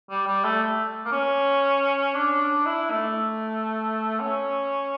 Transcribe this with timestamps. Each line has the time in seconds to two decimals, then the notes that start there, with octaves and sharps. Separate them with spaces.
0.10 G3
0.27 G3
0.44 A3
1.05 A#3
1.12 C#4
2.15 D4
2.66 E4
2.91 A3
4.20 C#4